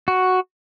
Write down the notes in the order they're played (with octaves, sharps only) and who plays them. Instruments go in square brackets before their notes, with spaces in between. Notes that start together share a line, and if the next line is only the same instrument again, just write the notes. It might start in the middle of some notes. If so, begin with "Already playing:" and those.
[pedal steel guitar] F#4